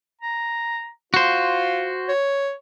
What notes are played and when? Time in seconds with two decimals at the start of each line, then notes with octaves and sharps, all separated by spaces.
0.21 A#5
1.14 F4 F#4 C5
2.08 C#5